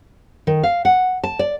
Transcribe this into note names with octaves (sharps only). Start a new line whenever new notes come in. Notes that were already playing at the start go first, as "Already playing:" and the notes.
D#3
F5
F#5
A5
D5